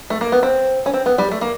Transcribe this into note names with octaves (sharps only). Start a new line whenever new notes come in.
A3
A#3
B3
C4
C#4
C4
B3
G3
A3
A#3